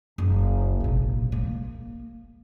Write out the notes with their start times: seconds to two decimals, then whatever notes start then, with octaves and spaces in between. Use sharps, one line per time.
0.18 F#1
0.80 A#1 C3
1.32 A#3